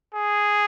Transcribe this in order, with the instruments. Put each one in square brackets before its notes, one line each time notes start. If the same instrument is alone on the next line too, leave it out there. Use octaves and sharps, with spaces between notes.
[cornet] G#4